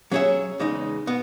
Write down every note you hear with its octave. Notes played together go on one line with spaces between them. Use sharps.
F#3 C#4 G#4 C#5 E5
E2 C#3 G#3 D#4
B2 B3